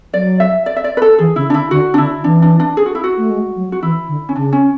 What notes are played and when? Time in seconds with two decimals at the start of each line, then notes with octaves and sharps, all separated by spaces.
0.14 F#3 D5
0.40 E5
0.66 D5
0.76 E5
0.84 D5
0.97 B4
1.02 A4
1.18 E3 G#4
1.36 C#3 E4
1.50 D4
1.54 D3 E4
1.71 D3 F#4
1.94 D4
1.97 D3 E4
2.24 E3 D4
2.42 D4
2.60 D4
2.77 G#4
2.86 F#4
2.95 E4
3.04 F#4
3.17 A3
3.30 G#3
3.56 F#3
3.72 F#4
3.82 E3 E4
4.08 D3
4.29 C#4
4.35 C#3 D4
4.52 C#4